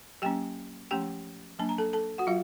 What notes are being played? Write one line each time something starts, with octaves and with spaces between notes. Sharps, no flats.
F#3 A#3 C#4 G4 G5
F3 A3 C#4 G4 G5
F#3 A#3 D4 A5
A#5
A4 A5
A4 A5
F#4 F#5
F#3 F4 F5